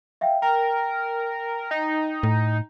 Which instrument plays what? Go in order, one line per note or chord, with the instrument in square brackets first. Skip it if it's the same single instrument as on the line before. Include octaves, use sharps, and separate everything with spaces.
[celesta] E5 F5 G5
[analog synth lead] A#4 [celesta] G5
[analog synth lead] D#4
[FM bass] A2